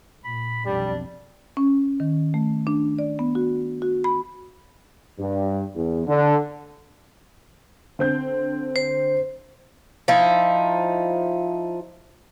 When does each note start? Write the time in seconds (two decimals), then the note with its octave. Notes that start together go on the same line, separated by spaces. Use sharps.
0.24 A#2 B5
0.66 B1 F2 G3 D4
1.57 C#4
2.00 D#3
2.34 A3
2.67 D4
2.99 D5
3.19 B3
3.35 F#4
3.82 F#4
4.04 B5
5.18 G2
5.74 E2
6.06 D3
7.99 D3 C4 G6
8.76 C5
10.08 F3 D#4 E4